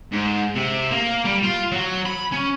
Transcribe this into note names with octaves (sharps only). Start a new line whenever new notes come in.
G#2
C3
A#3
G3
F4
F#3
B5
C#4